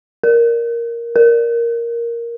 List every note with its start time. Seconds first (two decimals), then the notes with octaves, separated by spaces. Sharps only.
0.23 A#4
1.16 A#4